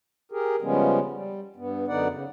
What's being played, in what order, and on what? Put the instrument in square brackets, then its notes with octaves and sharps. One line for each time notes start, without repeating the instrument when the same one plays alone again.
[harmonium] G4 G#4 A#4
C#3 F3 G3 G#3 B3 C#4
G3
G2 B3
F#2 D3 B3 D#4 D5 F#5
C#3